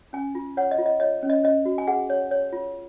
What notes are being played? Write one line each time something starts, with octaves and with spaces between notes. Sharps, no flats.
C#4 G#5
F4
C#5 F#5
D#5
F4
D#5
C#5 D#5
C#4
D#5
C#4 D#5
F#4
G#5
G#4 F#5
C#5
C#5
F4